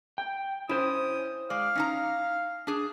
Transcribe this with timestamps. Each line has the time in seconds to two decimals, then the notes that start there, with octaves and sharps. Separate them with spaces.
0.18 G5
0.69 C#4 E4 C5 D#6
1.50 G#3 D5 F5
1.75 C#4 D#4 A#5
2.67 D4 G#4